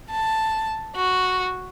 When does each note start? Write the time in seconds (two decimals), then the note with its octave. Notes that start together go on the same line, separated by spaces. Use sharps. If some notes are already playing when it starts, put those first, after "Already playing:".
0.11 A5
0.96 F#4